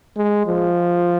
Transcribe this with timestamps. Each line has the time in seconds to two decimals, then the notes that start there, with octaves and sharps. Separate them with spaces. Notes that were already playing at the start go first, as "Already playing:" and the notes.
0.17 G#3
0.46 F3